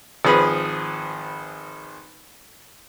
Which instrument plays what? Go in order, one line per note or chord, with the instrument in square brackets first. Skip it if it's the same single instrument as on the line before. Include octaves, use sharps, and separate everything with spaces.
[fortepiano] G#1 F3 G#4 B4 B5